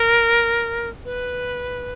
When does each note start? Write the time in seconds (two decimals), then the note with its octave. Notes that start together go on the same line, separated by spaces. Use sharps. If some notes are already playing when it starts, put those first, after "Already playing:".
Already playing: A#4
1.05 B4